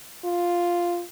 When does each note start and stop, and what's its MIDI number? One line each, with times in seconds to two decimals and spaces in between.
0.24 1.03 65